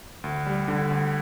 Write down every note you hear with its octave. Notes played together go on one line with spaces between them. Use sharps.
D2
G3
D3
D2